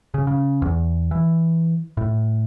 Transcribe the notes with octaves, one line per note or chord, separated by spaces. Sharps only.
C#3
C#3
E2
E3
A2